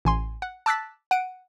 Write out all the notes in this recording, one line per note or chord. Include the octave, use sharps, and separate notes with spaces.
A1 G#5 C6
F#5
A5 D6 E6 F#6 A6 B6
F#5 D7 D#7